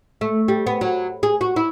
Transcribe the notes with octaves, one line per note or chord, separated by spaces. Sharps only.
A3
G3
B3
F#3
G#4
F#4
E4